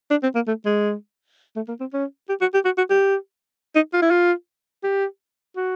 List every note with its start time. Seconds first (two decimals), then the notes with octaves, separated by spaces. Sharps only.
0.11 D4
0.23 C4
0.35 A#3
0.47 A3
0.65 G#3
1.56 A3
1.68 A#3
1.80 C4
1.93 C#4
2.29 G4
2.41 F#4
2.54 G4
2.65 F#4
2.78 F#4
2.90 G4
3.75 D#4
3.93 F4
4.02 E4
4.11 F4
4.84 G4
5.57 F#4